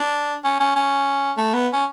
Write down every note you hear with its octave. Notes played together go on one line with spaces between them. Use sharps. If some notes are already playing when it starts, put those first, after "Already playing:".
Already playing: D4
C#4
C#4
C#4
A3
B3
C#4